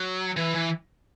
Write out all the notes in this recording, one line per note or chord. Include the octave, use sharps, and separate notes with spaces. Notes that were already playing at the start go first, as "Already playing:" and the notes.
Already playing: F#3
E3
E3